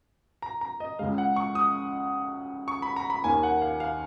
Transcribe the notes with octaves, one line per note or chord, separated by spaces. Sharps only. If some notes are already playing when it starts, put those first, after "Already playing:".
A#5
A#5
D#5
C#2 C#3 G#3 F5
F#5
C#6
D#6
C#6
B5
A#5
B5
D#2 D#3 A#3 G#5
F#5
F5
F5